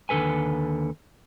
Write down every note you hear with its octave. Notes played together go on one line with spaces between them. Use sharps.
D#2 D3 A4 B4 G#5